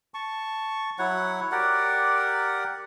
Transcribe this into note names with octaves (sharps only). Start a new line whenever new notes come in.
A5 C#6
F#3 E4 C#5 F#5
G4 A#4 D5 F#5